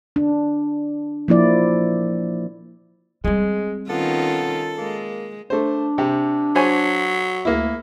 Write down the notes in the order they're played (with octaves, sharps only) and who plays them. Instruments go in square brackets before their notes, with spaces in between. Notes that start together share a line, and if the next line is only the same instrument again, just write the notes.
[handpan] D4
F3 A#3 E4 D5
[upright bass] G3 C4 [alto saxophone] G#3
[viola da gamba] D#3 C#4 F4 [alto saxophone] B3 [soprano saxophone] A4
[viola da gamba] G#3 [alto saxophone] A#3
[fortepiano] A3 C5 [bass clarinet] D4
[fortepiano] C3 G4
[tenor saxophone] F#3 [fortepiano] C5 C#5 G#5
[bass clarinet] D2 [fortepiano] A#3 E4